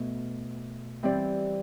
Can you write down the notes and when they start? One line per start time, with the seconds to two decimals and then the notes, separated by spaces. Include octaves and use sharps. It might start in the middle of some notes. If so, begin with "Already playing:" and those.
Already playing: B2 A3
1.03 E3 G3 C4 G4 D5